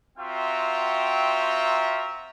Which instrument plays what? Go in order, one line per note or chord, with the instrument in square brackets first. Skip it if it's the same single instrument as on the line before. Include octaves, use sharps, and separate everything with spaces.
[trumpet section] C4 F4 F#4 E5 G5 A#5